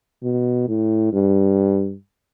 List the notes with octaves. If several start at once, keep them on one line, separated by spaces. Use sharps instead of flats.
B2
A2
G2